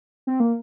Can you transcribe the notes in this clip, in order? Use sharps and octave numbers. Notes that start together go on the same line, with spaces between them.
C4
A#3